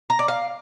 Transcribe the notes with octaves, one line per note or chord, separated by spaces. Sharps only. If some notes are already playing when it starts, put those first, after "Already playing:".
A#5
D5
F5